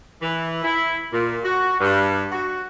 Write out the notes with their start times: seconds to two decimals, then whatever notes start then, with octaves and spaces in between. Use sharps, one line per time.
0.22 E3
0.64 E4
1.13 A#2
1.43 F#4
1.80 G2
2.32 F#4